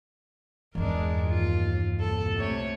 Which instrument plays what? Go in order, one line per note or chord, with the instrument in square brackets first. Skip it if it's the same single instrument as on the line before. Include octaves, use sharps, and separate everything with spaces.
[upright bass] E2 G2 [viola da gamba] G#3 D4 A#4
[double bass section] D#2 [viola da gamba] F4
[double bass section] C2 A#2 [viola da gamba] A4
[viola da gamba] C3 A3 C#5